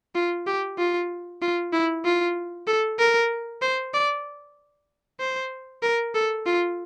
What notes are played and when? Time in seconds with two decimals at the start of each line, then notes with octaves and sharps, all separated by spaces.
0.15 F4
0.47 G4
0.78 F4
1.42 F4
1.73 E4
2.05 F4
2.67 A4
2.99 A#4
3.62 C5
3.94 D5
5.20 C5
5.83 A#4
6.15 A4
6.46 F4